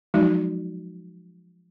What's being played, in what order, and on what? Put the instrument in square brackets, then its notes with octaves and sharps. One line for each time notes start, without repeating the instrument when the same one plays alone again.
[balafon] F3 F#3 G#3 D#4 F#4